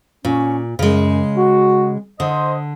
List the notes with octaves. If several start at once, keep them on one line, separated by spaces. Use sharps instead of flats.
A#2 C#4
F#2 C#3 G#3
F#4
D3 C5 D#5